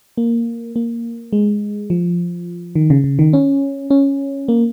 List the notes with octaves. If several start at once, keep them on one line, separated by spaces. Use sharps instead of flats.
A#3
A#3
G#3
F3
D#3
C#3
C#3
D#3
C#4
C#4
A#3